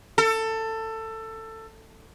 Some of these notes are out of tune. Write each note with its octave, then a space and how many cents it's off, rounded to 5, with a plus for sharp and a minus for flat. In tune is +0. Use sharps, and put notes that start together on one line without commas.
A4 +20